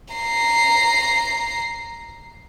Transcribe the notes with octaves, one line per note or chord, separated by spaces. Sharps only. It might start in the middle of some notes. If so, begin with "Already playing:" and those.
A#5 C7